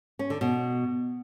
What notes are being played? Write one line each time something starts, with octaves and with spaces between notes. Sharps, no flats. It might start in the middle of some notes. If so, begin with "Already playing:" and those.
C#4
D3
B2